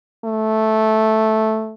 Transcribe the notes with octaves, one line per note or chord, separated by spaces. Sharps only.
A3